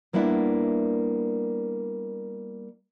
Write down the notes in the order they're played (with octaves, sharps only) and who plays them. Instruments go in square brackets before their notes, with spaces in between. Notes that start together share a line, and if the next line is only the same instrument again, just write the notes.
[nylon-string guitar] G3 A#3 B3 D4 E4